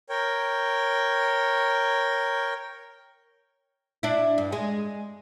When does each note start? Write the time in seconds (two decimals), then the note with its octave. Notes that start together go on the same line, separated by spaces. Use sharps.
0.09 A#4 C#5 G5
4.03 D4 E4
4.38 G2
4.52 G#3